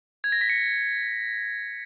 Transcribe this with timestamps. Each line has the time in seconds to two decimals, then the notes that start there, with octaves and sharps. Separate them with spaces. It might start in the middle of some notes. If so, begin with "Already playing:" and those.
0.24 G#6
0.32 A#6
0.41 B6
0.49 C#7